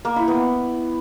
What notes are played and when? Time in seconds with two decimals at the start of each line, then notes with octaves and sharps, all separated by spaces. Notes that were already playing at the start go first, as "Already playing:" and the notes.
0.05 A#3
0.16 E4
0.28 B3